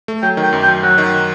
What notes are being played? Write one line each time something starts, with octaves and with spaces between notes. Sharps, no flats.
A3
F#3 G5
D#3
G5
F#2
G5
F#2
F#3 F#5
D#3